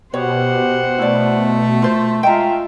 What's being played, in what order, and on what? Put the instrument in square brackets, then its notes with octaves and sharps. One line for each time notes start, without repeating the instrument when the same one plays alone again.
[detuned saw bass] B2 [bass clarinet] G4 [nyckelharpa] C5 F#5 [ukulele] C#5
[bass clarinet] A3 [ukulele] E4 D5
[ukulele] F4 C5
[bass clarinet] G#3 [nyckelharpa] F4 E5 [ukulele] G5 A#5